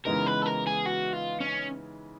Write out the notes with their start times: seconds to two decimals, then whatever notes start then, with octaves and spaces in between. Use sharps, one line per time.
0.05 C#3 E3 G#3 B3 D#4 A#4
0.26 B4
0.42 A4
0.46 A#4
0.67 G#4
0.86 F#4
1.13 F4
1.40 C#4